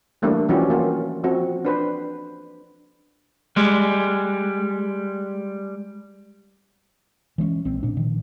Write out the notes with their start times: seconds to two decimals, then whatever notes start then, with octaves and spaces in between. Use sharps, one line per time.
0.22 E3 G3 A3 A#3 D4
0.49 E3 F3 G3 C#4 F#4 G4
0.70 E3 A#3 F4 F#4
1.24 F3 C4 F#4
1.65 D4 B4 C5
3.57 G3 G#3
7.38 E3 G#3 C4 C#4
7.65 A#1 C4
7.83 A#2 D4
7.97 A#2 D#3 F3